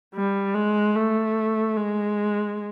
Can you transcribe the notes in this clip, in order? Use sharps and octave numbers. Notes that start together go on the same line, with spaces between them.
G3
G#3
A3
G#3